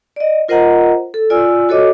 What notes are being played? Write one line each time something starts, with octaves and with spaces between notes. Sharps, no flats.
D5 D#5
F4 A#4 C5 D#5 F#5 A#5
A4
F4 D5 G#5 E6
F#4 A4 C#5 D#5 D6